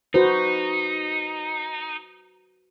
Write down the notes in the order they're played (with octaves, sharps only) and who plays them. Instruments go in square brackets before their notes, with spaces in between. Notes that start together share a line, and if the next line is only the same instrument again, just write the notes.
[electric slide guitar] D#4 [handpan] F#4 B4 C5